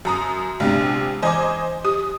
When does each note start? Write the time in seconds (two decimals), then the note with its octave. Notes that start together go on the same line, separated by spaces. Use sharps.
0.05 F#2 A#5 D#6
0.60 A#1 C3 G#3 B3 D4
1.22 E3 C5 D#5 G#5 A#5 D6
1.85 G4 D#6